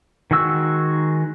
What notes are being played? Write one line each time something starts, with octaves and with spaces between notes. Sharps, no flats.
D#3 G#3 F#4 E6 F#6